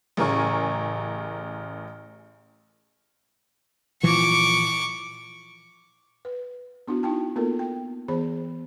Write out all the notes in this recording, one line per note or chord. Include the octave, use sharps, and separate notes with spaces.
A1 C#3 A#4 G#5 C#6
A#2 E3 F3 C#6 D6
B4
B3 D4 E4 F#4
D#4 E4 G5 A5
A#3 B3 F4 A4 A#4
G5
E3 B3 G#4 C5 B5